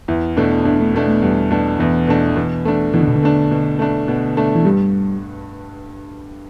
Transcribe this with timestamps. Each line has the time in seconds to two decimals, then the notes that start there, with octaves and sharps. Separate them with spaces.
0.08 E2 E4
0.37 B2 A3 D4
0.65 E2 D4
0.80 A3
0.93 B2 A3 B3 D4
1.08 A3
1.22 E2 G3
1.51 B2 A3 D4
1.79 E2 E3
2.07 B2 A3 D4
2.36 B2 E3
2.65 A3 D4
2.93 B2 E3
3.01 D3
3.08 B2
3.16 D3
3.23 A3 D4
3.51 B2
3.79 A3 D4
4.08 B2
4.37 A3 D4
4.55 E3
4.65 G2 G3